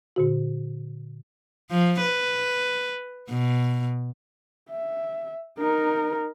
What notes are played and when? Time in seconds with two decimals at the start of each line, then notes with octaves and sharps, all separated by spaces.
0.16 A#2 D3 F#4
1.70 F3
2.01 B4
3.30 B2
4.71 E5
5.58 D#4 A#4